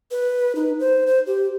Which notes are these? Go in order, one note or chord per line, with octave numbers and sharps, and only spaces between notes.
B4
D#4
C5
C5
G4